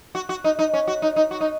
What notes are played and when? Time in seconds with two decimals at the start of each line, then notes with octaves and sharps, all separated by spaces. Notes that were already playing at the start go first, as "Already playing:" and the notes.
0.15 F#4
0.29 F#4
0.44 D#4
0.59 D#4
0.74 C#4
0.88 F#4
1.02 D#4
1.16 D#4
1.31 F#4
1.41 D#4